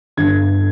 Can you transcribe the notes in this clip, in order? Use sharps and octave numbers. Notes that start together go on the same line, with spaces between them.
G1 G2 D3 G#6